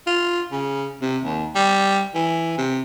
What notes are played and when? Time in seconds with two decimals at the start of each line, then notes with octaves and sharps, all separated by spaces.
0.07 F4
0.52 C#3
1.01 C3
1.24 D#2
1.55 G3
2.15 E3
2.58 C3